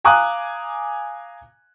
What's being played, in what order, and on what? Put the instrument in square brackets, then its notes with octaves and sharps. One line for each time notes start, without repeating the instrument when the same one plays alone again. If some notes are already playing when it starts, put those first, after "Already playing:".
[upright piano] F5 G#5 A#5 D6 D#6 F#6